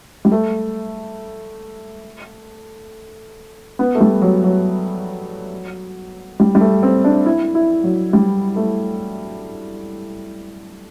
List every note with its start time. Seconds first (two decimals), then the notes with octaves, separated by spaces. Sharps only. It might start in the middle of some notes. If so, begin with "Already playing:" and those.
0.25 G3
0.32 A3
3.79 B3
3.95 A3
4.00 G3
4.22 F#3
4.44 F#3
6.40 G3
6.55 G3
6.61 A3
6.83 C4
7.04 D4
7.26 E4
7.55 E4
7.83 F#3
8.13 G3
8.56 A3